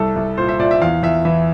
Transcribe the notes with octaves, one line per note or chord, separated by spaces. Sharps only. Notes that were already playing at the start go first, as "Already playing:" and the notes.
Already playing: C2 A4
C2
A#2 C5
E5
A#2 D5
E5
E2 F5
E2 E5
E3 E5